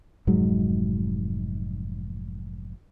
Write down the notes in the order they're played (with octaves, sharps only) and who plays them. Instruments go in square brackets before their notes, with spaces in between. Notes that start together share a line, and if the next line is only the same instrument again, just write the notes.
[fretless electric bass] F1 G#2 F#3 G#3